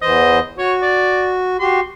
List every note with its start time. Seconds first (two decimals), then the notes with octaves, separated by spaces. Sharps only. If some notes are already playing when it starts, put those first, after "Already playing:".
0.02 E2 E3 C5 D#5
0.58 F#4 C#5
0.82 D5
1.59 F#4 G4 C6